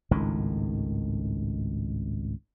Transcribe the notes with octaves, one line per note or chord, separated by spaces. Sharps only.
G#1 C#2 A2 D#3